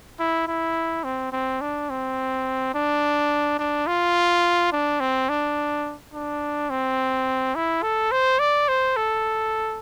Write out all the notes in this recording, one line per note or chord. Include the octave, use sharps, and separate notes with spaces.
E4
E4
C4
C4
D4
C4
D4
D4
F4
D4
C4
D4
D4
C4
E4
A4
C5
D5
C5
A4